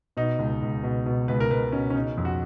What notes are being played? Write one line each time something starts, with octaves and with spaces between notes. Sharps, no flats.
B2 D#4
C#2
C#2
B2
B2
C#2 B4
A#4
C#2 B4
B2 C#4
C#4
C#3 D#4
F2
F#4